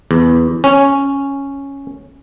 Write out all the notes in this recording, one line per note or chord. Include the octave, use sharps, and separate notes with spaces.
E2
C#4